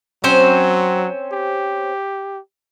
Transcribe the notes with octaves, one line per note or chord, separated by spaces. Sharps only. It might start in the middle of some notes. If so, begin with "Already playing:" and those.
F#3 C4 C#4 C5
G4